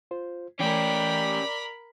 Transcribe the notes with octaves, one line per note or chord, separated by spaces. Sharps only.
F4 C5
E3 A3 C#4 G4 A#4 D5 B5